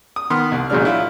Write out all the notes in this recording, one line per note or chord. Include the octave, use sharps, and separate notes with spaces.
D#6
D#3 B3 C6 D#6 F6
C2
A1 A#2 F#3 G#3 D4 F6
F#3 E4 F4